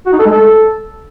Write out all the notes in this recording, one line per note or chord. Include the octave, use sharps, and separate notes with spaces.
F#4
D#4
A4
G#3
A4